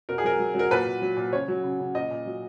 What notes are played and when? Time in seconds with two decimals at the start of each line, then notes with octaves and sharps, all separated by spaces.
0.09 B2 A#4
0.18 G#4
0.24 F#3 A#4
0.39 F#3
0.55 F#3 A#4
0.71 A#2 B4
0.85 A#2
1.02 F#3
1.16 A#2
1.32 C#3 C#5
1.48 F#3
1.64 C#3
1.80 C#3
1.94 A#2 D#5
2.11 A#2
2.26 F#3